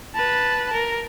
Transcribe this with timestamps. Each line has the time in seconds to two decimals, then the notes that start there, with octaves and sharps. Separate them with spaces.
0.15 B4 A5
0.73 A#4